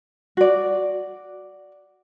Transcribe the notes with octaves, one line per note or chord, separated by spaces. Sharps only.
F#4 D5